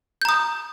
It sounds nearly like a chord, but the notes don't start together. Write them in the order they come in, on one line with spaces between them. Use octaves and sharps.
G6 A#5 D#6